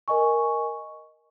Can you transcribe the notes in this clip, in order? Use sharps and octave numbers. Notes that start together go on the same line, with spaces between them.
A#4 D#5 G#5 C#6